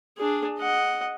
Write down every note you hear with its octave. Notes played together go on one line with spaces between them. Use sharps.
D4 G#4
D#5 F#5